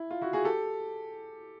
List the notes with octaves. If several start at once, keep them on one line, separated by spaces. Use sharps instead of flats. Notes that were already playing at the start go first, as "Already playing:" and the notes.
Already playing: E4
F4
E4 F#4
F#4 G#4
G4 A4